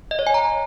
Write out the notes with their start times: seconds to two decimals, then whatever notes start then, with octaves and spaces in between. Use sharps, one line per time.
0.11 D#5
0.19 C#5
0.27 G#5
0.34 A#5